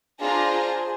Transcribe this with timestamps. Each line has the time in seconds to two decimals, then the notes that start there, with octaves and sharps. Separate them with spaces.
0.20 D4 F4 G#4 C5 A#5